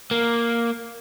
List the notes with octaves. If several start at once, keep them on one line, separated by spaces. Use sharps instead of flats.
A#3